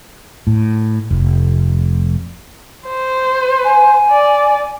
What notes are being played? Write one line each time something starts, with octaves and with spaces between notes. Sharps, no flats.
A2
F1
C5
G#5
D5